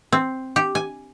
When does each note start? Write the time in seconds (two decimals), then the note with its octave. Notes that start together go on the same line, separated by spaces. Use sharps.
0.12 C4
0.56 G4
0.75 G#5